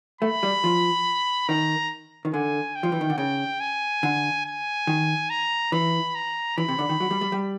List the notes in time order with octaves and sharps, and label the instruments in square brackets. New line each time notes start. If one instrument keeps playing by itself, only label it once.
[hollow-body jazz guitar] A3 [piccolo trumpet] B5
[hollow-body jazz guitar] G3
F3
[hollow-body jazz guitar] D#3 [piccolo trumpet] A#5
[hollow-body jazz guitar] D#3
[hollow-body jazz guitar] D3 [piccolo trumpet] G#5
[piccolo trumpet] G5
[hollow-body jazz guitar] F3
E3
D#3
D3
[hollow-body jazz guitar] C#3 [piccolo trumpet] G5
[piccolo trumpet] G#5
[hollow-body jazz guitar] D3
[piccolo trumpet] G#5
[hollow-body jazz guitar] D#3
[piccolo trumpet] A#5
[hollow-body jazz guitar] E3 [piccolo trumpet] B5
[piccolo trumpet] A#5
[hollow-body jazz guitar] E3 [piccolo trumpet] B5
[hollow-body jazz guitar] C3
D3
D#3
F#3
G3
G3
G3